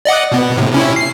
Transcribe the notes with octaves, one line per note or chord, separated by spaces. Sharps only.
D5 D#5 F#5
B2 B3
A2 C3
C3 C#4 E4
C7